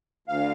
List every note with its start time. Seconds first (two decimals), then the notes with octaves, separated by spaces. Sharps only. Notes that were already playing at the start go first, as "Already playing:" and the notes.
0.28 D2 F5